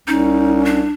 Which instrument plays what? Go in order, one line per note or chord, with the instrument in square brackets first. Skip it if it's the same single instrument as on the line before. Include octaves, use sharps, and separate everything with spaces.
[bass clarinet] C2 [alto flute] C#4 [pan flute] D#4
[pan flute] D4